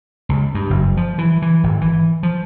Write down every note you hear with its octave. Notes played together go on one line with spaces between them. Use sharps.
C#2
G2
F#1
F3
E3
E3
G#1
E3
F3